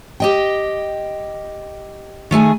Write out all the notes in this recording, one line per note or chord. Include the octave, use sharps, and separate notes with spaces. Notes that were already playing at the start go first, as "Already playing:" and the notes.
G4 D#5 G5
D#3 A3 G#4 G#5